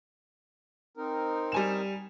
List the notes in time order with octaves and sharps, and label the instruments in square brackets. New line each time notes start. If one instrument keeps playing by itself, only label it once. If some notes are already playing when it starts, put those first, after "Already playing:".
[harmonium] C4 D#4 A#4
[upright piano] G3 G#5 E7